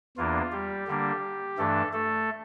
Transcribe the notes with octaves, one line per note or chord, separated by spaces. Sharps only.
E2 E3 A#3 D4 F4
G3 G4
D3 G3 A#3 D4
G2 E3 A3 D4 A4
A3 A4